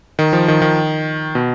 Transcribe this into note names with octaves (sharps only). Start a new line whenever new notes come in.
D#3
F3
D#3
D#3
B2